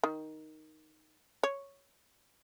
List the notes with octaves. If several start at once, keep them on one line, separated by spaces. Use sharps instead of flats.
D#3
C#5